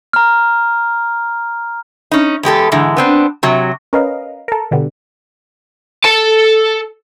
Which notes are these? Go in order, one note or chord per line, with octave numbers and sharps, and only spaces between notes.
A#5 F6
C#4 D#4
E2 G#3 G4 A4
G#2 D3 E3 G#3
B3 C4 D4
C3 F#3
C#4 A#4 B4 D#5 F5
A4 A#4
B2 D3 G3 B3
A4 A5